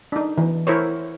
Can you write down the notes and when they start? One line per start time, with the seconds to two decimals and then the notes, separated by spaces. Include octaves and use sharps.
0.12 D4 D#4
0.38 E3
0.67 E4 A#4 C5 C#5